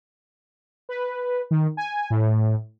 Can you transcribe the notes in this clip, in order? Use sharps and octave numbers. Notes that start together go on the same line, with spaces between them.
B4
D#3
G#5
A2